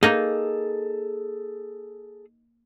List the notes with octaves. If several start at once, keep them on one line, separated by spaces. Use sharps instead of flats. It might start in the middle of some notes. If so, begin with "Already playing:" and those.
A#3 D#4 G#4 A4